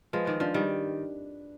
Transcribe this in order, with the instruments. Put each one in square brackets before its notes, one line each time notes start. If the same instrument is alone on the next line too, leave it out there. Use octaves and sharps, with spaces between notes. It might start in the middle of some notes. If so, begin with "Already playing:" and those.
[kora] F3 G#3 [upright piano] B4
[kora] D#3
[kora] F3 [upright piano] D4
[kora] D#3 G3